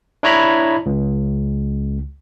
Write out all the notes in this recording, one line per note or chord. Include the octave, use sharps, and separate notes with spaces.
D4 E4 C#5 A#5 B5
C#2